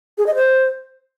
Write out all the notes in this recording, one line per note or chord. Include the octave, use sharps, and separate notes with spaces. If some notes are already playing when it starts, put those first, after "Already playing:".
G#4
D#5
C5